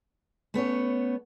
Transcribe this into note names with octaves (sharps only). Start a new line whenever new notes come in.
A3 B3 C#4 C#5